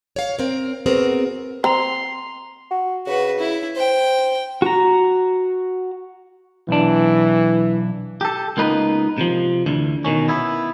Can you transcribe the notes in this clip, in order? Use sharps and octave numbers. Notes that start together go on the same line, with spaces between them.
C#5 F5
C4 A#4
B3 C4 F#4 G#4 A#4
C4 A#5 C6 F7
F#4
C#3 F#4 B4
E4
C5 G5
F#4 A#5
B1 E3 D4
G4 A4
C#2 A#3 B3 D#4 B4
C3 F3
D2 D3 E3
B2 D#3 C#4
B3 E4